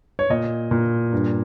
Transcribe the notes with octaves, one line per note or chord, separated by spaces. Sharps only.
C#5
A#2 D#5
A#2
G2